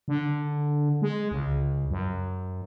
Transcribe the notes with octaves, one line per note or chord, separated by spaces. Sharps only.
D3
G#3
C#2
F#2